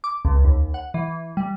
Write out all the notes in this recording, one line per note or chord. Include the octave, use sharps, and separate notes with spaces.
D6
C#2
D#2
F#5
E3
G3